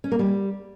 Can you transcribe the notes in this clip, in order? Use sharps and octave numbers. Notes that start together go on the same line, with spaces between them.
C#4
A#3
G3